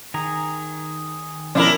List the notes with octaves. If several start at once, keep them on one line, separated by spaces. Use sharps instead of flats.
D#3 G#4 A#5
B2 F3 C#4 D4 E4 A#4